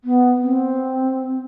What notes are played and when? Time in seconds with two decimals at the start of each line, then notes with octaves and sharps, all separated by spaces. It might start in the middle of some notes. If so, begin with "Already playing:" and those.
0.04 B3
0.41 C4